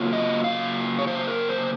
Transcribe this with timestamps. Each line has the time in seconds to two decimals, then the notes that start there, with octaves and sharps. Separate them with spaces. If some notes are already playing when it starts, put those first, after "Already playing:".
Already playing: C#3 F#3 A#3 F4
0.13 D#5
0.44 F5
0.99 C#5
1.07 C5
1.28 A#4
1.49 C5